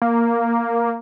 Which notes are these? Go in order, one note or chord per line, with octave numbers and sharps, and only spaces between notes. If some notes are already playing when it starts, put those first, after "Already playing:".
A#3